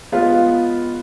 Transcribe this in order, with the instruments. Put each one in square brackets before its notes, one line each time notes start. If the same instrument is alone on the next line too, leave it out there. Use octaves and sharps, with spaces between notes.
[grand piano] G#3 B3 F4 B4 F5